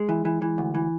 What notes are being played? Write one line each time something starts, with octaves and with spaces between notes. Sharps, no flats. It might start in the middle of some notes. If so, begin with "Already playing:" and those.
Already playing: G#3
E3
E3
E3
D2
E3